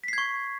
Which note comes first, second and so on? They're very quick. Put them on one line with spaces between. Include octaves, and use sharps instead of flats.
B6 C7 G#6 C#6